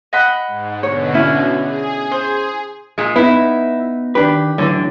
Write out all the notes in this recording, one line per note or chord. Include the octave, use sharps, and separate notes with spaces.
D#5 F#5 B5
G#2
B2 D3 C#5
C#4 E4
G#4
C5
A#2 G#3
B3 D#4 E4
D#3 D4 G4 B4
F#2 A2 D3 E3